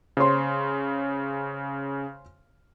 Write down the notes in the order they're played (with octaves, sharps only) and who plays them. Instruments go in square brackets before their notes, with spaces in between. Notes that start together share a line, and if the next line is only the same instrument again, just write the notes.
[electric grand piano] C#3 [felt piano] C5 C#5 C6